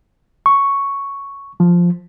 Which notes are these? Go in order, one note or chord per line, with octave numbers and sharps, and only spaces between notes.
C#6
F3